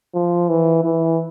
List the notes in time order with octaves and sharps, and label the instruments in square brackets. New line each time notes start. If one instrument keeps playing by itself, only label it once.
[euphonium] F3
E3
E3